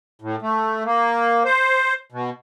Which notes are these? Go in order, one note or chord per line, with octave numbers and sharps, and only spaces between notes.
A2
A3
A#3
C5
B2